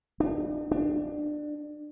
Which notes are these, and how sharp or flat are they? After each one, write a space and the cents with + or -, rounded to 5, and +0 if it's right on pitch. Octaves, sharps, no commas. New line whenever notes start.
D4 +40
D4 +25